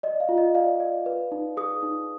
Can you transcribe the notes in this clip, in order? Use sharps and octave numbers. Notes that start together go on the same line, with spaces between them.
D5 D#5
F5
F4
D#5
D5 F5
D5
B4
D#4
G#4 D#6
D#4